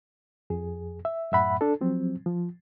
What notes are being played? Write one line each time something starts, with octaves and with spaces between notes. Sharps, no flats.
F2 G#4
E5
F#2 A2 E5 F#5 B5
D4 A4
F3 F#3 C4
F3